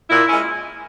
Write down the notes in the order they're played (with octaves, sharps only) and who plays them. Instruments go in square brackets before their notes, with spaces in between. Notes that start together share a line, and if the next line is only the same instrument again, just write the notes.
[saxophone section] A#2 E4
G#3 C#4 E4